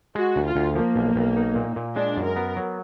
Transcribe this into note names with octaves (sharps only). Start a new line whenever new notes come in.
G#3 F#4
D2
F4
D2
F3 A#3
B1
B1
D#4
A#2
A#2
G#3 D4
F#2
A#4
B3
F#3